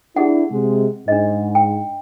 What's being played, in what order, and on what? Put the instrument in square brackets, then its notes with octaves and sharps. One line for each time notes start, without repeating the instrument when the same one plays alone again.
[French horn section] D4 E4 [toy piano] G4 G#4 F#5
[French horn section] C3 G#3
[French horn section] G#2 [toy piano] D4 D#5
[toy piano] G5